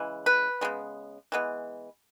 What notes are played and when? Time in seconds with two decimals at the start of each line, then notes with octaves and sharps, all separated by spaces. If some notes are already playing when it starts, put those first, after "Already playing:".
Already playing: C#3 E3 G#3
0.26 B4
0.61 C#3 G#3 B3
1.32 E3 G#3 B3